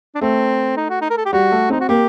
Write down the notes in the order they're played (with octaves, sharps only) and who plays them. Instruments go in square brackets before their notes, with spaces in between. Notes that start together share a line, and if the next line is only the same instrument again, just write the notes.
[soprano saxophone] D4
[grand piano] A3 [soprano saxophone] C4
[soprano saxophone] D#4
F#4
D#4
A#4
A4
G4
[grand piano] G3 [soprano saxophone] F#4
[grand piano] A3
[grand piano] C4 [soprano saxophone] D#4
[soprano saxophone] F#4
[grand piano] A#3 [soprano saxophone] G4